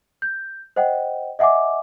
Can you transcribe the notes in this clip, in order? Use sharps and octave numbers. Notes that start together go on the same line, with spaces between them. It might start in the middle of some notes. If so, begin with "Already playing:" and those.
G6
C5 D#5 F#5 G5
D#5 E5 F#5 G#5 D6